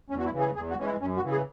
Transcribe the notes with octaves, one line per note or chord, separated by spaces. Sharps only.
E2 C#4
F#4
E4
C#3 E3
G#4
E2 G#4
F#4
E3 G#3 C#4
E4
F#2 C#4
F#4
C#3 E3
G#4